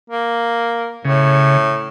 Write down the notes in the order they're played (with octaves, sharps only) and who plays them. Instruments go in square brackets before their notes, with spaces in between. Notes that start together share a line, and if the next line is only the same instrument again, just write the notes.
[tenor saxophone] A#3
[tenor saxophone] A2 [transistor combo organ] C#3